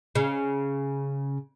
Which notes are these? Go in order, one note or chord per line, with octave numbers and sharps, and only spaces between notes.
C#3